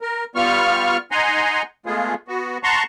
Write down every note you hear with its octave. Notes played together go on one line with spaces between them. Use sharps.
A#4
G3 B3 F4 C#6 F6
D#4 F#5 G#5 A#5 C6
G#3 A3 B3 F4 G#4
B3 F#4
F#5 A5 A#5 C6 C#6